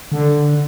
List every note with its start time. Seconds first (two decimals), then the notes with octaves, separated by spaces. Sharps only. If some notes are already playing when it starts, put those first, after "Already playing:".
0.12 D3